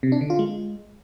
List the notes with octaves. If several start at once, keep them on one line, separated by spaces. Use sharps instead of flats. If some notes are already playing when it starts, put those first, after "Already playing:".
C3
D4
D3
F4
G#3